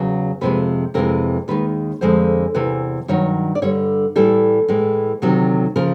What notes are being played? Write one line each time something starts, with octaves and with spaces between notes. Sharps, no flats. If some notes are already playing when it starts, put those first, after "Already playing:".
Already playing: E2 C#3 F#3
F2 C3 F3 G#3 B4
F2 C3 E3 G#3 A#4
D#2 D#3 G#3 B4
F2 D3 F3 G#3 C5
E2 C3 E3 B4
G2 D#3 F#3 C#5
D5
G2 D3 G3 C#5
A2 E3 G3 A4
A2 E3 G#3
D2 C3 D#3 F#3
C#3 F3 A#4